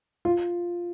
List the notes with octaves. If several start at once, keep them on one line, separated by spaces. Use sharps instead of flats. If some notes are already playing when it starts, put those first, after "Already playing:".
F4